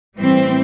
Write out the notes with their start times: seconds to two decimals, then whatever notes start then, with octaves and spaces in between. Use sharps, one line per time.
0.18 A2 E3 G3 C4